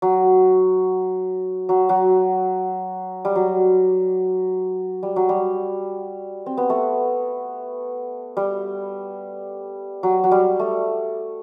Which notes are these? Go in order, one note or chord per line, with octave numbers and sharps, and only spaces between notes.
F#3
F#3
F#3
G3
F#3
G3
F#3
G3
C4
B3
A3
G3
F#3
F#3
G3
A3